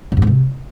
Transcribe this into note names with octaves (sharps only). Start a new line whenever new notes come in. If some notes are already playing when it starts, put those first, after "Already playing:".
C#3
G2
G#2
C3